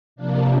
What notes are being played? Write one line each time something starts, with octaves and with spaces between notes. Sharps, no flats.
C3 F3 A#3 D4